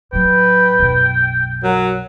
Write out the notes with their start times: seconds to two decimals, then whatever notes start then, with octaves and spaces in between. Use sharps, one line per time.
0.13 A2 F#3 B4 G5
0.79 B1 F#2
1.63 F#3 A#4